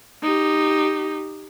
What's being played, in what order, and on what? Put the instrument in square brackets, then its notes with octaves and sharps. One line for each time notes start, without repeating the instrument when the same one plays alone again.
[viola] D#4 G4